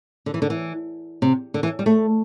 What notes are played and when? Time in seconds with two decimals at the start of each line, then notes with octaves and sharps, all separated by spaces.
0.26 D3
0.34 E3
0.42 D3
0.50 E3
1.22 C3
1.54 D3
1.63 E3
1.79 G3
1.86 A3